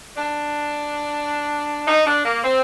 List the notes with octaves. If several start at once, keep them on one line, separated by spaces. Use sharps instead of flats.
D4
D#4
D4
A#3
C4